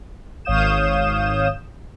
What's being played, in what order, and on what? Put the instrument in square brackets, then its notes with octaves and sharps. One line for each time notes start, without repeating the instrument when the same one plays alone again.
[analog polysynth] G#1 C#5 F5 D#6 G6 E7